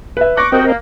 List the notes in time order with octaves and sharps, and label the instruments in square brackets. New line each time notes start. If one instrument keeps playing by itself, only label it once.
[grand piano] B4 E5
[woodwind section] C#6 D6 [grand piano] F#6 A#6
[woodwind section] C2 F#4 G5 [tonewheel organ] C4 A#4 D#5
[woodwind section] A#3